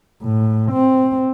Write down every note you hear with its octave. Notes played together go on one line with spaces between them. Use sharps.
A2
C4